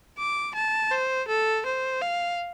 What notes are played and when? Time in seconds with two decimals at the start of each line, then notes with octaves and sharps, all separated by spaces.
0.18 D6
0.55 A5
0.91 C5
1.28 A4
1.66 C5
2.02 F5